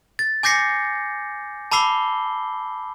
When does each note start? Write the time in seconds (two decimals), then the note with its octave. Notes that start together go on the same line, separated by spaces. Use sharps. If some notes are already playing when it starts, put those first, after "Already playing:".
0.19 A6
0.43 G#5 D6 G6 A#6 C7 C#7
1.72 A5 B5 D6 E6 C7 G7